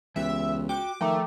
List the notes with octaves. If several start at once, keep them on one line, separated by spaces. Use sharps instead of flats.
C#2 E3 B3 G4 E5
F#4 G5 D6
D#3 F3 A3 G5 A#5 D6